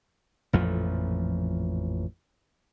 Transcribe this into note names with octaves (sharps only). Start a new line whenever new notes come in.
A1 F2 A#2 F3